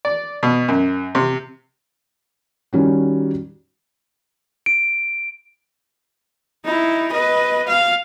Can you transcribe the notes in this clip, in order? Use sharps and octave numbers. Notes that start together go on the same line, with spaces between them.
D5
B2
F#2
C3
D#3 G3 C#4 F#4
D7
D#4 E4
B4 D#5
F5